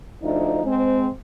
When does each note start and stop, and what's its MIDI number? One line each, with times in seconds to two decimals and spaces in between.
0.22 0.59 38
0.22 0.59 53
0.22 0.59 62
0.22 0.59 63
0.64 1.07 56
0.64 1.07 60